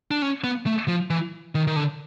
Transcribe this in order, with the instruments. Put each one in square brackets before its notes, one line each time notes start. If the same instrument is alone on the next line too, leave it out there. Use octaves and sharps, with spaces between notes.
[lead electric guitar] D4
C#4
B3
A3
F3
E3
D#3
D#3
D3